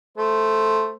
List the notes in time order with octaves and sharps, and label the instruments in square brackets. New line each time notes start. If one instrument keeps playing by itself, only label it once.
[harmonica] A3 C5